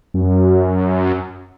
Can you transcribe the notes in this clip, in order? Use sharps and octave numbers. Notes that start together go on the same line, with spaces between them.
F#2